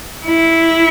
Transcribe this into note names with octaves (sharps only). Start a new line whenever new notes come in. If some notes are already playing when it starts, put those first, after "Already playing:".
E4